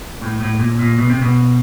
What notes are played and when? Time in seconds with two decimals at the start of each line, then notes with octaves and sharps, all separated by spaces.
0.21 A2
0.41 A2
0.59 A#2
0.79 A#2
0.98 B2
1.10 C3
1.22 B2